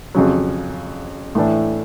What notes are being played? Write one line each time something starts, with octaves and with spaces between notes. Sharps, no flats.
F2 C#3 F#3
A2 E3 A3 D4